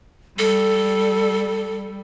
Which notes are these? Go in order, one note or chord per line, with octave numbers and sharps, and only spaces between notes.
G3 A4